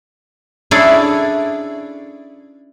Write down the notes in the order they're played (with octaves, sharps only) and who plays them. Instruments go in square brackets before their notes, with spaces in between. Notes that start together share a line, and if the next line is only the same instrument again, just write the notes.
[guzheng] C#4 D4 E4 G#4 A4 D5